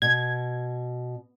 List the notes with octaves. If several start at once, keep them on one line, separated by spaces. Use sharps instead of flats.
B2 G#6